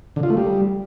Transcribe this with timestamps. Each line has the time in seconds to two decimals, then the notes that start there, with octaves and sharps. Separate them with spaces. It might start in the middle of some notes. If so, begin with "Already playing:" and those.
0.16 D3
0.23 F4
0.30 A3
0.37 G3